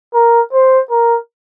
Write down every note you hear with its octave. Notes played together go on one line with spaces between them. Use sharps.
A#4
C5
A#4